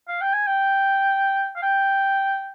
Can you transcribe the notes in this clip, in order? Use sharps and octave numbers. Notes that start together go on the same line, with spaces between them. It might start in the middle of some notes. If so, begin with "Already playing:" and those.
F5
G5
G#5
G5
F5
G5